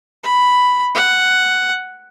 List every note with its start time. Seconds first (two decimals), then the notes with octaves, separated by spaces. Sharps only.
0.23 B5
0.95 F#5